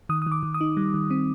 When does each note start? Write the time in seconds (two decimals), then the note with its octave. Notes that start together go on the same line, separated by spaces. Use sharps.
0.09 D#3 D#6
0.22 D#3 D#6
0.32 D6
0.43 D#3
0.54 D#6
0.61 D#4
0.77 G3
0.94 D#3
1.11 C4